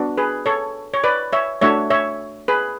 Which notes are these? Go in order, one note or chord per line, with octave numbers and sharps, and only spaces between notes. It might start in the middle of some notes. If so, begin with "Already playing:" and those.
Already playing: B3 D4 F#4
G#4 B4
A4 C#5
C#5
B4 D5
C#5 E5
A3 D4 F#4 C#5 E5
C#5 E5
G#4 B4